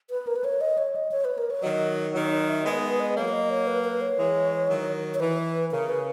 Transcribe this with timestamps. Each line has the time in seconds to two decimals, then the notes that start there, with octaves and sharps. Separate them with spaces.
0.10 B4
0.27 A#4
0.36 B4
0.44 C#5
0.61 D#5
0.78 C#5
0.96 D#5
1.12 C#5
1.25 B4
1.38 A#4
1.50 C#5
1.63 D#3 F#3 D#5
2.14 D#3 F#3 C#5
2.28 E5
2.31 D#5
2.49 E5
2.65 G#3 B3 D#5
2.74 A#4
2.83 B4
3.00 D#5
3.17 F#3 A#3 C#5
3.33 D#5
3.50 C#5
3.67 B4
3.84 B4
4.01 C#5
4.18 E3 G#3
4.69 D#3 F#3
5.14 C#5
5.20 E3 B4
5.71 C#3 A#4
5.89 B4